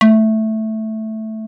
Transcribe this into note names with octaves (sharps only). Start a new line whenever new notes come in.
A3